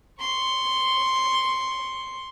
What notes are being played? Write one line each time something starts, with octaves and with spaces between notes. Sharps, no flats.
C6 C#6